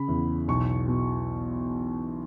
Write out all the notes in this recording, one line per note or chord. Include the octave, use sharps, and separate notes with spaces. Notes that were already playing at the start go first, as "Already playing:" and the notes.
Already playing: C#3 B5
E2
B1 C#6
B2